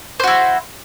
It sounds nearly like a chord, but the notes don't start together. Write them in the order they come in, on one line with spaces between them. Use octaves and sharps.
C5 F#4 E4